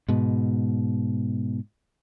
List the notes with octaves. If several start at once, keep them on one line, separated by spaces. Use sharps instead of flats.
G#2 B2